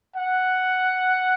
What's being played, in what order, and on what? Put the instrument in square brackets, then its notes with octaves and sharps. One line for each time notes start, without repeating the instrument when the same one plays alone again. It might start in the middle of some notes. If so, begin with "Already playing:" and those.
[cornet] F#5